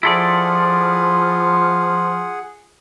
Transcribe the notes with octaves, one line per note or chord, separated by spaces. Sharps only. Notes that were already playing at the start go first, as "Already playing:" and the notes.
F3 E4 F4 G#4 A4 D5 F#5